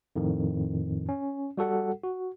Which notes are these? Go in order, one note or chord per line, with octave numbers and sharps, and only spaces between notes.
F2 A2 D#3
C#4
G3 F#4 A4 F#5
F#4